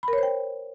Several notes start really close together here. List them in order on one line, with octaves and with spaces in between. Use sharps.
B5 A#4 C#5 C5 G5